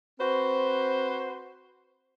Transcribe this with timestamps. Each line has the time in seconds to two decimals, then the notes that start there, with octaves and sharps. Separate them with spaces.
0.19 C4 F#4 B4 C5